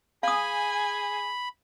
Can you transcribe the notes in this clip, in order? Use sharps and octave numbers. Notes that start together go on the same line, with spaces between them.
G#4 F5 G#5 B5 D#6